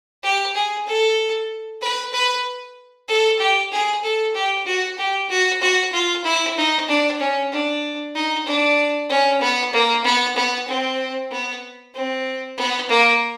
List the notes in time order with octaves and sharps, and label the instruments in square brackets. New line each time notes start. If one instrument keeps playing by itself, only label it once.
[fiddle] G4
G#4
A4
B4
B4
A4
G4
G#4
A4
G4
F#4
G4
F#4
F#4
F4
E4
D#4
D4
C#4
D4
D#4
D4
C#4
B3
A#3
B3
B3
C4
B3
C4
B3
A#3